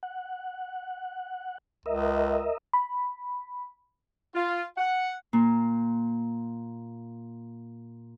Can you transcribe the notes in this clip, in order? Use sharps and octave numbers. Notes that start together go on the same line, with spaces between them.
F#5
C#2 A#4 D#5 E5
B5
F4
F#5
A#2 A#3